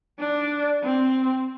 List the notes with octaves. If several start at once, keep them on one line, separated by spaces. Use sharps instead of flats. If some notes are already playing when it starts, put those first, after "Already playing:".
D4
C4